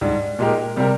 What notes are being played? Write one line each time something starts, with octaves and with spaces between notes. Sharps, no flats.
G#2 G3 D4
A#2 G#3 D#4 G4 A#4
C3 G3 C4 G4 A#4